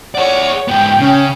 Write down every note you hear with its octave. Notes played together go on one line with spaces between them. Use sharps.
G#4 C#5 D5 F#5
G#2 B3 G5
C#3 C#4